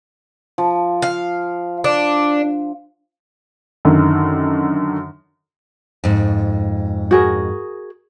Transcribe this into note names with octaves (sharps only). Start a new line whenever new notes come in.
F3
F5
D4
F#2 D3 D#3
F2 G#2
F#4 G#4 A#4